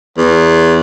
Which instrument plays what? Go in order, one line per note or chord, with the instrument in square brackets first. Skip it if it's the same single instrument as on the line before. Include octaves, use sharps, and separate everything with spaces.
[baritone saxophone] E2